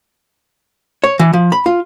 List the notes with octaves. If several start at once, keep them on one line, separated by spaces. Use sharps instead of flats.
C#5
E3
F3
B5
F4